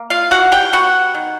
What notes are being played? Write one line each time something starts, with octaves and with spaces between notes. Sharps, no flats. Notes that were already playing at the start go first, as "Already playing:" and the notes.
Already playing: A#3
F4 F5
E3 F#4 F#5
G4 G5
B3 F#4 F#5
D#3